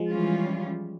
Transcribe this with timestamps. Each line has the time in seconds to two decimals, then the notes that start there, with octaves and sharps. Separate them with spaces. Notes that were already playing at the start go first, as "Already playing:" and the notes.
Already playing: F3 G#3
0.10 E3 G3 C#4 F4